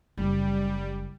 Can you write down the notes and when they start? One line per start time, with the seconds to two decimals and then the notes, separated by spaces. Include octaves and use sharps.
0.17 F#1 G3